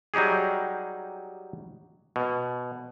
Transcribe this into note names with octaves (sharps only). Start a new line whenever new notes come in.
F#3 G3 D#4 G4 G#4
B2